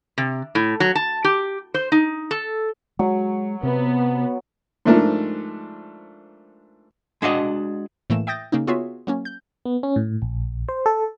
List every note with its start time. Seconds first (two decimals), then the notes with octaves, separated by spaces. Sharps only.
0.18 C3
0.55 A2
0.80 F#3
0.95 A5
1.24 G4
1.74 C5
1.92 D#4
2.31 A4
2.99 F#3 G#3
3.63 C3 B3
4.85 G#2 F3 A3 D4 A#4
7.22 G#3 D4 F#4 D#5
8.10 A2 E3 A3 A#3 E7
8.27 E5 G5 D#6 G6 A6 A#6
8.52 C#3 A#3 C#4 D#4
8.67 B3 F4 F#4 G#4 C#5 E5
9.07 F#3 A#3 C#4
9.25 G6
9.65 B3
9.83 C#4
9.96 A2
10.22 A#1
10.69 C5
10.86 A4